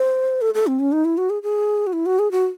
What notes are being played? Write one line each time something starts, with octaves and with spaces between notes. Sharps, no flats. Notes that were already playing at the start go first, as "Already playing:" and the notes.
Already playing: C5
A4
A4
C4
C#4
D#4
E4
F#4
G#4
G#4
F#4
E4
F#4
G#4
F#4